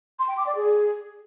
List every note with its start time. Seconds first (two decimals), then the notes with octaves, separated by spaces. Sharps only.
0.19 C6
0.28 G5
0.37 D6
0.46 D5
0.56 G#4